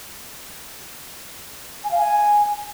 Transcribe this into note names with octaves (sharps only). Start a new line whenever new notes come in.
G#5
F5
G#5